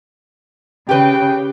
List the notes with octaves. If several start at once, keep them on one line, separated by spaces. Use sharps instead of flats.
C#3 G4 B4 G5